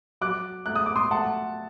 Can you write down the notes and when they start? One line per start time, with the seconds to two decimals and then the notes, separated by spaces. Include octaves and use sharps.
0.21 F#3 D6 F#6
0.66 A3 F#6
0.76 D#6
0.86 D6
0.96 C6 D#6
1.11 A3 F#5 A5